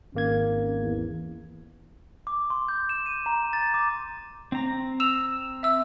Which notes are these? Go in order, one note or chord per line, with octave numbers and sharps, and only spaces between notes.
G#1 A#3 C#4 G#6
E2
D6
C6
G6
E7
D#7
A#5
A6
D6
C4 A#5
E6 E7 F7
E5 E6